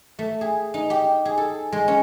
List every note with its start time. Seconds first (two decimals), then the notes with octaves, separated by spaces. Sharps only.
0.19 A3
0.41 G#4
0.74 D#4
0.90 G4
1.25 G#4
1.38 A4
1.72 G#3
1.88 C#4